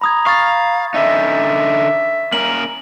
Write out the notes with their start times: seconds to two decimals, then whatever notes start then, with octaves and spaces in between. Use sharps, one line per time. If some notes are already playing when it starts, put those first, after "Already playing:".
0.01 A#5 B5 D#6 G#6
0.26 F5 C#6 A6
0.94 D3 C#4 D#4 E5
2.33 A#3 C#4 A#4 F#7